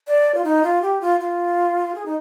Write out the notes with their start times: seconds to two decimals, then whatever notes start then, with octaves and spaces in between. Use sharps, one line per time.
0.07 D5
0.35 F4
0.44 D#4
0.63 F4
0.82 G4
1.01 F4
1.20 F4
1.95 G#4
2.06 D#4